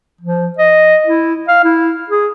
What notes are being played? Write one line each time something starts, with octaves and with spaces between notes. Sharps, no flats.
F3
D#5
E4
F5
E4
G#4